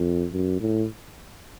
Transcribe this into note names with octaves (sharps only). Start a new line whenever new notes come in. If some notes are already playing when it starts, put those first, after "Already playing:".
Already playing: F2
F#2
A2